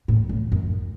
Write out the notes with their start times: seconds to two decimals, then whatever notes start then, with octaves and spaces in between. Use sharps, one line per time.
0.08 A2
0.29 A2
0.52 F#2